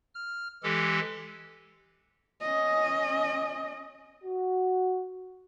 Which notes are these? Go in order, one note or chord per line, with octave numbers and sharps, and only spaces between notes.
F6
E3 G#3 G4 A4
C#4 D#5
F#4